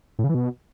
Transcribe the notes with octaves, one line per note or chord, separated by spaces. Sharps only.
A2
C#3
E3
B2